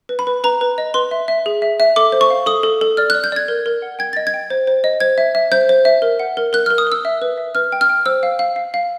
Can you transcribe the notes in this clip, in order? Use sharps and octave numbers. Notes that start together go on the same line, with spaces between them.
B4
B5
B4
B4 A#5
B4
D#5
B4 C6
E5
E5
G#4
E5
E5
A4 D6
C5
C#6
F5
A4 D#6
A4
A4
D5 F6
F#6
D5
G6
D5 G#6
A#4
A#4
F#5
G5 G#6
D#5 A6
G#6
G5
C5
C5
D#5
C5 G#6
E5
E5
C5 G6
C5
E5
A#4
F#5
A#4
A#4 F#6
F6
A#4
D#6
A#4 E6
E5
B4
E5
B4 F6
G5
F6
G5
C5 E6
F5
F5
F5
F5